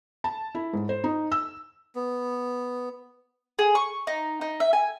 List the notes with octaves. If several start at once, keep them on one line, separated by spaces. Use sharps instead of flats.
A5
E4
G#2
C5
D#4
E6
B3
G#4
C#6
D#4
D#4
E5
G#5